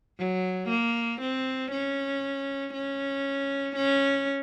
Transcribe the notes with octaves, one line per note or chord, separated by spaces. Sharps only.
F#3
A#3
C4
C#4
C#4
C#4